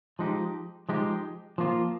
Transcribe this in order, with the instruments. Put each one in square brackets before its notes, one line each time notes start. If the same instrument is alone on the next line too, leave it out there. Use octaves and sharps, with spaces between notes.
[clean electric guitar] F3 G#3 D#4 G4
F3 G#3 D#4 G4
F3 A#3 F4